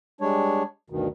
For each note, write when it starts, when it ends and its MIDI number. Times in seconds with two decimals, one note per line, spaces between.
0.21 0.63 55
0.21 0.63 56
0.21 0.63 62
0.21 0.63 73
0.90 1.08 38
0.90 1.08 43
0.90 1.08 47
0.90 1.08 51